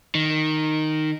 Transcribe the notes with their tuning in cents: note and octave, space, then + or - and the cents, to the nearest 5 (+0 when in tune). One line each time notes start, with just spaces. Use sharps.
D#3 -5